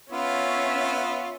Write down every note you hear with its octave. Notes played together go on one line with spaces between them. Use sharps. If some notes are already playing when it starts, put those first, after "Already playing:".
B3 C#4 F4 E5